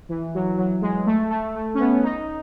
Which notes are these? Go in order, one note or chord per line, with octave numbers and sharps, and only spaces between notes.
E3
F#3
F#3
G#3
A3
A3
A3
C#4
B3
D#4